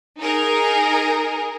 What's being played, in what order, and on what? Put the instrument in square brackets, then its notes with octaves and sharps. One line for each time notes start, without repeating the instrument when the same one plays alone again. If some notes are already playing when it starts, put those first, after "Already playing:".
[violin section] D#4 G#4 A#4